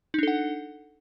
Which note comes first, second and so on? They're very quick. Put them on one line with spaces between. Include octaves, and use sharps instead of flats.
D#4 D4 A4 F#5